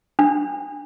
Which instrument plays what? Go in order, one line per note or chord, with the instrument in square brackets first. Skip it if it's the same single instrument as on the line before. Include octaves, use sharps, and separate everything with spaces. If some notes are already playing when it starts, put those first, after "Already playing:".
[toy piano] D4